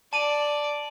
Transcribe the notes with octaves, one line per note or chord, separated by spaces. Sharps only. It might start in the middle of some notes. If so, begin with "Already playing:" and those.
D5 A5 D#7